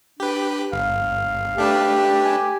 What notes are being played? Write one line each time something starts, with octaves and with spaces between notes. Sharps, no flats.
D4 G4 B4
G1 F5
A3 D4 G4 B4
G#5